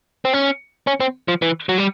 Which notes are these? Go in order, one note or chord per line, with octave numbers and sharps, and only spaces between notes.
C4
C#4
C#4
C4
F3
E3
F#3
G3